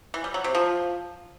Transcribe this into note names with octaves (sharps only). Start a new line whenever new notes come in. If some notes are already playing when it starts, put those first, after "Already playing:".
E3
G3
F#3
C3
F3